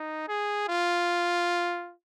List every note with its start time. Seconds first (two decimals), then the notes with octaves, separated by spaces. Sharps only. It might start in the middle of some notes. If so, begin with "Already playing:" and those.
Already playing: D#4
0.28 G#4
0.69 F4